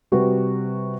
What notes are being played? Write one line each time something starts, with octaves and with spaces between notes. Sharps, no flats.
C3 G3 F#4 G4 B4